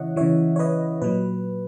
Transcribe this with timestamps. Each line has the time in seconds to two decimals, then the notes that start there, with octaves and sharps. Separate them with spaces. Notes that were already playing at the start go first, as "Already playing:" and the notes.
Already playing: C#3 E3 C#5 D#5 E5 F#5
0.16 C#3 E3 C#5 E5
0.56 C#5
0.59 B4 D#5
1.02 A#2 F#3 B4